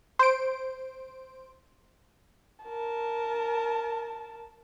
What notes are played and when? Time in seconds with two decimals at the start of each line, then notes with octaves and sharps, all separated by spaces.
0.19 C5 D7
2.65 A#4 A5